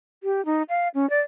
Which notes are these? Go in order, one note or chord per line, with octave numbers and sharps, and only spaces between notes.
G4
D#4
F5
C#4
D5